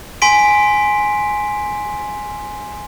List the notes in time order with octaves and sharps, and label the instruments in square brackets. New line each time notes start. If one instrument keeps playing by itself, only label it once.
[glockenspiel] G#5 C6 B6 D7